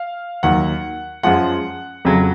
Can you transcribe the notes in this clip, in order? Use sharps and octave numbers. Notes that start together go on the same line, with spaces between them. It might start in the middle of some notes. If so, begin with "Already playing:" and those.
Already playing: F5
D#2 D#3 F#3 F#5
F#2 F3 G#3 F#5
F2 C#3 F#3